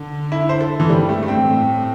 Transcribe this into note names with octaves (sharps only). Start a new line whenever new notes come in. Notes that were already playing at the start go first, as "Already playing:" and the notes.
Already playing: D3
E4
C5
A4
E3
G2 G3
A3
A3
C4
A2